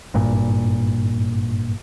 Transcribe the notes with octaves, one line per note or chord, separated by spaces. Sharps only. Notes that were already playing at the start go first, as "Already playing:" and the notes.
G#1 G2 A#2